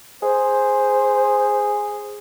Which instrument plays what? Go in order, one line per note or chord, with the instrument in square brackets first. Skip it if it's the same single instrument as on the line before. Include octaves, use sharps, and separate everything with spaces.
[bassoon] G#4 [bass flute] C5